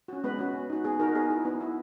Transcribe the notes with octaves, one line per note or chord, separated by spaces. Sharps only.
C#4 F#4
G#3 B3 B4
C#4 F#4
B3
D#4 F#4
B3 G#4
D#4 F#4 A#4
B3 G#4
E4
B3
E4